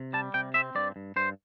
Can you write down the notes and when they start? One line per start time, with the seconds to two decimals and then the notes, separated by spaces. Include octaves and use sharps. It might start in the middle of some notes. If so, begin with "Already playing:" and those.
Already playing: C3
0.13 G3 A5
0.34 C3 G5
0.54 C4 E5
0.75 G2 D5
0.96 G2
1.16 G2 C5